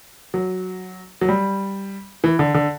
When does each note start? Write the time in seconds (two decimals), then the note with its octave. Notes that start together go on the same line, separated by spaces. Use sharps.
0.34 F#3
1.21 F#3
1.29 G3
2.24 E3
2.39 D3
2.54 D3